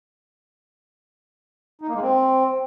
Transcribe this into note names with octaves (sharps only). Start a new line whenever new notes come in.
D#4
A#3
G#3
C4